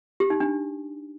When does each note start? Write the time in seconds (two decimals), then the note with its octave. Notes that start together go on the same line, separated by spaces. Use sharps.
0.20 G4
0.30 D#4
0.40 D4